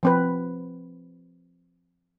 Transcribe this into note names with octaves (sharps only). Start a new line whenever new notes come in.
F3 C4 B4